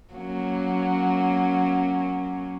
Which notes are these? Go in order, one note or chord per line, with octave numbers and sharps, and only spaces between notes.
F#3 A#3 C#4